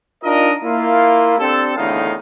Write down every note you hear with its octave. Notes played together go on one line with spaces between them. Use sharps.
D4 D#4 F4 A#4 D#5
A#3 E4 F4
C4 D4 G4 A4
E2 A2 D3 D#3 D#4 F5